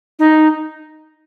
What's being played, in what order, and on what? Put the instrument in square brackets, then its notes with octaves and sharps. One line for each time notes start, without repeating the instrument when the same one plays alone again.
[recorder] D#4